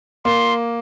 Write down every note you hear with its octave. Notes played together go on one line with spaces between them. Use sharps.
A#3 C6